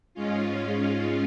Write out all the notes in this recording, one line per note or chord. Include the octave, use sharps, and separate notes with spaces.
G#2 G#3 C#4 F4